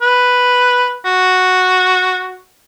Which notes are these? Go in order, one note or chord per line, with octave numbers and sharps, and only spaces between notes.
B4
F#4